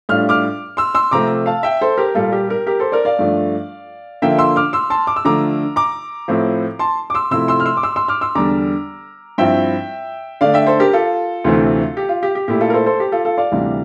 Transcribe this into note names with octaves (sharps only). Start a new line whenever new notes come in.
A2 G3 D4 F4 F6
D6 F6
C6 E6
C6 E6
C3 F3 A3 C4 A#5 D6
F5 A5
E5 G5
A4 C5
G4 A#4
A#2 G3 A#3 F4 A4
G4
G4 A#4
G4 A#4
A4 C5
A#4 D5
D5 F5
G2 F3 A3 D4
D3 F3 A#3 F4 E5 G5
C6 E6
D6 F6
C6 E6
A5 C6
D6
E6
D3 F3 A3 A#5 D6
A#5 D6
A2 F3 C4 E4
A5 C6
D6
C6 E6
C3 F3 A3 E4 C6 E6
C6 E6
F6
C6 E6
D6
C6 E6
C6 E6
D6 F6
C6 E6
E2 D3 G3 D4 A#5 D6
G2 F3 C4 E4 E5 G5
D3 A3 D4 D5 F5
E5 G5
A4 C5
G4 A#4
F4 A4
D2 C3 E3 A3 C4
G4
F4
G4
G4
A#2 A3 E4 G4
F4 A4
A#4
A4 C5
A4 C5
G4
F4 A4
F4 A4
D5 F5
D2 C3 E3 G3